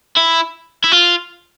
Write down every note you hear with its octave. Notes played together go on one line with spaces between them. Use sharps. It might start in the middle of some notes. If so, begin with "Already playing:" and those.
E4
E4
F4